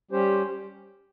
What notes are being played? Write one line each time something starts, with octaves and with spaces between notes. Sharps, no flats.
G3 C#4 G4 C5